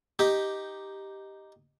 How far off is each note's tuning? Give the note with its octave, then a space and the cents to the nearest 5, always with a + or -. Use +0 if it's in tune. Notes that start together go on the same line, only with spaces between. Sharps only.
D#4 +0 G4 +0